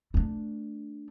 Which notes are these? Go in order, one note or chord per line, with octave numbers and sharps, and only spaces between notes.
A3 D4